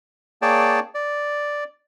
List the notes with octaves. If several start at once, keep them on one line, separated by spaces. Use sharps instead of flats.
A#3 G#4 C#5 D5 G5 A5
D5